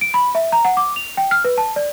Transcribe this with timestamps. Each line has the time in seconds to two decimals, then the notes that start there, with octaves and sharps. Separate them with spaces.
0.01 D7
0.14 B5
0.35 E5
0.52 A#5
0.65 F#5
0.77 D6
0.96 F7
1.17 G5
1.31 F6
1.45 B4
1.58 A5
1.76 D5